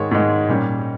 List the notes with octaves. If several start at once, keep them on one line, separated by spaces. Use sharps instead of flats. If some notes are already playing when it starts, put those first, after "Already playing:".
Already playing: G#2 D#3 G#3 C#5
G#2 D#3 G#3
A#2 G3 C#4